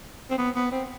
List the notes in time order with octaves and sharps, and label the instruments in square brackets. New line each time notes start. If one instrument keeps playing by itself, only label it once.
[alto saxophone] C4
B3
B3
C4